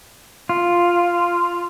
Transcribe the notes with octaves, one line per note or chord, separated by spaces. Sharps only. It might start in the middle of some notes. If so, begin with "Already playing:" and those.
F4